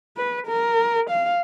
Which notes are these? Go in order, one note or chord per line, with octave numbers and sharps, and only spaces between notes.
B4
A#4
F5